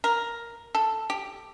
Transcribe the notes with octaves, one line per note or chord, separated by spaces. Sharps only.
A#4
A4
G4